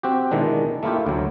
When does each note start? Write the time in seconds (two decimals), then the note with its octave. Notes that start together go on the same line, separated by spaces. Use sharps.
0.03 C4 F#4 G4
0.31 B2 D#3 E3 G#3 D4
0.83 A3 A#3 E4 F4 G4
1.06 D2 F#3